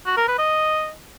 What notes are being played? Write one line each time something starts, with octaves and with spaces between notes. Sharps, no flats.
F#4
A#4
B4
D#5